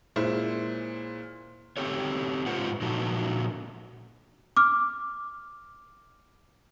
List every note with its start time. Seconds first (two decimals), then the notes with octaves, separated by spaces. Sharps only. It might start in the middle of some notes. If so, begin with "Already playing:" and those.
0.16 A#2 G#3 C#4 E4 C5
1.77 C4 G4 A4 C#5
2.46 G#2 F4 B4 C5 F#5
2.81 A#2 F3 D#4 F#4 A4
4.57 D6 F6